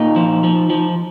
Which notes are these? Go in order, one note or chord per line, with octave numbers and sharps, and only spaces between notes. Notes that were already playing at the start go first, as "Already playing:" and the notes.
Already playing: A#2 D#4
F3
F3
F3